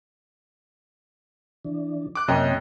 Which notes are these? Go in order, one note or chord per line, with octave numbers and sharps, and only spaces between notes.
E3 D4
D6 F#6
F#2 C3 A#3 C#4 D#5 G5